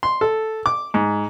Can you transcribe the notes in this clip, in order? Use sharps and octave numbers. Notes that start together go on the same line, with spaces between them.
C6
A4
D6
G#2